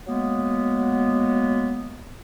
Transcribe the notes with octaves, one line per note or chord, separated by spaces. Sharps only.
F#3 G#3 A#3 B3